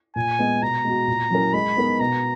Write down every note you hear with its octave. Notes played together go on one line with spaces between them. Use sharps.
A#2 G#5
G#3 B3
B2 A#5
G#3 B3 F#4
A#2
F#3 C#4 E4 A#4
G#3 B5
B3 D#4 A#4
B2 A#5